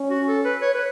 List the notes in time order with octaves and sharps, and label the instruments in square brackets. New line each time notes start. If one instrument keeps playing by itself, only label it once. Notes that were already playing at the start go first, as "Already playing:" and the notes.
Already playing: [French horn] C#4
[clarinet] F#4
A4
B4
C#5
B4